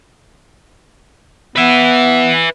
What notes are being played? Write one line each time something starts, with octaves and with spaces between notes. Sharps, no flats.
B3 B4 E5